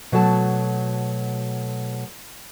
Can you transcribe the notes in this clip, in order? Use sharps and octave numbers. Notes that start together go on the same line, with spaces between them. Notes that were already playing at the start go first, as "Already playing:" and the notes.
B2 F#3 A3 A4 A5